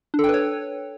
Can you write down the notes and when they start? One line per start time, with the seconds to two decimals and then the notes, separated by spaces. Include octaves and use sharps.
0.14 D4
0.19 A4
0.24 G5
0.29 B4
0.34 C#5